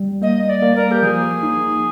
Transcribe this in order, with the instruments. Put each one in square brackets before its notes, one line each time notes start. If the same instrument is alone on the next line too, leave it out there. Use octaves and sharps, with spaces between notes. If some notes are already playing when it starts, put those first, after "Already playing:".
Already playing: [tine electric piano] G3
[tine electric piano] A#3 [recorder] D#5
[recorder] D5
[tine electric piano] A#3
[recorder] A#4
G4
[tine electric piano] F3 [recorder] G#4
[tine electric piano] D#4